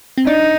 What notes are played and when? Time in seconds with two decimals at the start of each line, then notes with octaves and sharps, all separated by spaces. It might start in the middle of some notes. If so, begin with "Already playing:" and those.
0.18 C4
0.27 D4 D#4